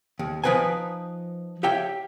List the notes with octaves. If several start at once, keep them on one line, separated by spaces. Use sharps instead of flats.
D#2
F3 D#4 B4 C5 G#5
G4 C#5 E5 F5 G5